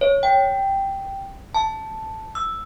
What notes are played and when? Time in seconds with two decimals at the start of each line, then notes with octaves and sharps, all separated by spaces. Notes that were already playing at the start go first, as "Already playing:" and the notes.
0.01 C#5
0.23 G5
1.55 A5
2.35 E6